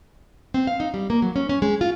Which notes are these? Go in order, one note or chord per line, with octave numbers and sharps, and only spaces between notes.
C4
F5
D#4
G3
A#3
F#3
C#4
C#4
G#3
F4